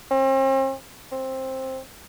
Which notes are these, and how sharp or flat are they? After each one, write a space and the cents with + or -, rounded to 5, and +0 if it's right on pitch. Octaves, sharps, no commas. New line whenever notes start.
C4 +40
C4 +10